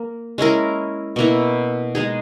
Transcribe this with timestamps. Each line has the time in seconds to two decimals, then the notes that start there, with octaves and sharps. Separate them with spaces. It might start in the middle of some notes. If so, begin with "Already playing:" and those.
Already playing: A#3
0.38 G#3 C#4 E4 A#4
1.16 B2 A#3 E4
1.95 G#3 D#4 G#4